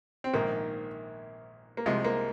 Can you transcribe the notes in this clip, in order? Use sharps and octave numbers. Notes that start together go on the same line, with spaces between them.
C4
A#1 G#2 D#3 A#3
A#3
C2 C3 F3 G#3
A#3